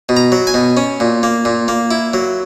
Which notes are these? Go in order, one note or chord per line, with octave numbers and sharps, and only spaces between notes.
B2
A#5
F#3
G#5
B2
C#4
A#2
A#3
A#2
A#3
E4
F#3